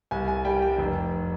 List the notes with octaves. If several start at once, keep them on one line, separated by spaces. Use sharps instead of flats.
C2 G#5
G#5
G3 G5
G5
F1